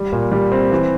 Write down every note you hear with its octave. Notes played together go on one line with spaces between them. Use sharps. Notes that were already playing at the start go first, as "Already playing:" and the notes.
Already playing: G3
A#2
G3
C4
E3